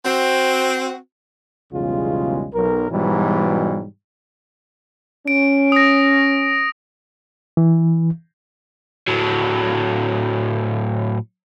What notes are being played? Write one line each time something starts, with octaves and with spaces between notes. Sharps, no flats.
C4 F#4
B1 E2 C#3 G3 G#3 F4
B1 A#4
G#2 B2 E3 F#3 G3
C#4 D7
D#6 A#6
E3
A2 F#3